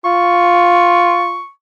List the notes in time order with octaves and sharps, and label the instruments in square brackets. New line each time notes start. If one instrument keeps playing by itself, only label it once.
[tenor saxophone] F4 [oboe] C#6